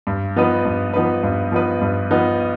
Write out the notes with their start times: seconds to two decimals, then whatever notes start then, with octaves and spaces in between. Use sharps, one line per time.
0.07 G2
0.36 F3 B3 D#4 B4
0.65 G2
0.94 F3 B3 D#4 B4
1.23 G2
1.52 F3 B3 D#4 B4
1.81 G2
2.11 F3 B3 D#4 B4